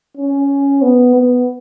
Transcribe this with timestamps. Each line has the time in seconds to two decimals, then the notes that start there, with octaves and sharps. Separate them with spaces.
0.17 C#4
0.82 B3
1.15 B3